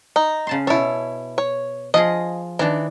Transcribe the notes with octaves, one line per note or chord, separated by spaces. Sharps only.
D#4
C#3 A5 C6
B2 E4 A4 C#5
C#5
F3 F4 G#4 D#5
D#3 E3 D4